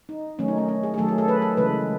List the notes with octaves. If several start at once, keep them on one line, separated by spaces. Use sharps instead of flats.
D#4
D#3 F#3 A3 C#4
D#4
C#4
C#4
G#4
G#4
D#3 F#3 A3 A4
G#4
A4
B4
A4
C#3 E3 G#3 B4